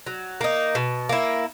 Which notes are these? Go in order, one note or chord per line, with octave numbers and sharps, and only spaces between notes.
F#3
A#3 D#4
B2
A#3 E4